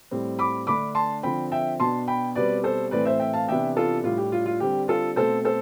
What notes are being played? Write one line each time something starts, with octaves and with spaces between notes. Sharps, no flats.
A2 G3 C4
B5 D6
D3 A3 D4 B5 D6
A5 C6
D3 F3 C4 G5 B5
E5 G5
B2 B3 D4 A5 C6
G5 B5
B2 G3 C4 B4 D5
A4 C5
A2 E3 A3 C4 B4 D5
C5 E5
E5 G5
F5 A5
C3 E3 B3 D4 E5 G5
F4 A4
A2 G3 D4 F4
G4
F4
F4
D3 G3 C4 G4
F4 A4
B2 A3 C4 A4 C5
A4 C5